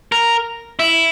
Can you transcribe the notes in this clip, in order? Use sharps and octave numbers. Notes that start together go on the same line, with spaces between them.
A#4
E4